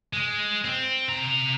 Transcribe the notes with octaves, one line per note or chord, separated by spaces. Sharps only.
G#3
C4
C3 A#5